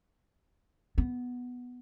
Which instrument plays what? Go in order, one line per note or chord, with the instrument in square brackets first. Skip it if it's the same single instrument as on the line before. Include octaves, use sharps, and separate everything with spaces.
[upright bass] B3